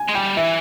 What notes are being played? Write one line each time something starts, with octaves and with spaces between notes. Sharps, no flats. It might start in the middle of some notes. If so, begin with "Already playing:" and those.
Already playing: G#5
G#3
G3 G5
E3 E5